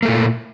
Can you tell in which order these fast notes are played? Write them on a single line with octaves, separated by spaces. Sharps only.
A#3 A3 A#2